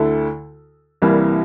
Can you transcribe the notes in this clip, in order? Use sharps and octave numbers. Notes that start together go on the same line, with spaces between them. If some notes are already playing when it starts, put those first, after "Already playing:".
Already playing: D2 D3 E4 A4
C2 C3 E3 G3 A#3